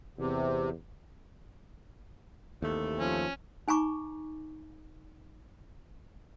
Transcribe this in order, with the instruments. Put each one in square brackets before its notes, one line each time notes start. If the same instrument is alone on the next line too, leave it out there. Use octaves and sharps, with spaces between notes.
[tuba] E2 [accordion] C3
[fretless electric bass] D#2 [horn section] C3 E3 A3
[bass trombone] F3 [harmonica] C#4
[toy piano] D#4 G#5 A#5 C#6 D6